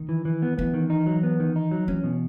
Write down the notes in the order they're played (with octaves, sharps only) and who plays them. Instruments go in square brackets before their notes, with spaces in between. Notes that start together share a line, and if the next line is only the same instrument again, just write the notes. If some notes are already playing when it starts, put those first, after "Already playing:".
Already playing: [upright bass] D#3
[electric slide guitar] E3
E3
B3
[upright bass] E3 [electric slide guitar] B3
[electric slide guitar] D#3
D#4
F#3
B3
D#3
D#4
F#3
[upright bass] E3 [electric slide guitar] C#4
[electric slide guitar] B2